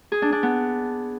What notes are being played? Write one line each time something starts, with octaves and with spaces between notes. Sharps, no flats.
G#4
D4
D4
B3